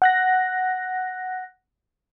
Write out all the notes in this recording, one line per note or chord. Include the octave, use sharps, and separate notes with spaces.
F#5 F#6 A#6